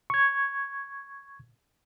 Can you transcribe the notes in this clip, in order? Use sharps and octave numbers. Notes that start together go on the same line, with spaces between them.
C#6 G#6